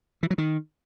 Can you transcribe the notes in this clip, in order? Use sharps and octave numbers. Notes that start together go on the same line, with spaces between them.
E3
F#3
D#3